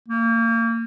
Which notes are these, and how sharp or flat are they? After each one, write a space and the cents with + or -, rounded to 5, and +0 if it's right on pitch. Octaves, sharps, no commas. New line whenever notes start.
A#3 -30